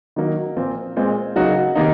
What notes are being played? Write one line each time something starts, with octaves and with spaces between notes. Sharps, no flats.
D#3 F#3 A#3 D#4
A#2 F3 C4
A#2 G#3 C4
C#3 F#3 A#3 D#4 F#4
C3 D#3 A#3 D#4